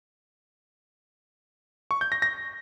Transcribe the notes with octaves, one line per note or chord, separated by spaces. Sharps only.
C#6
G6
A#6
A#6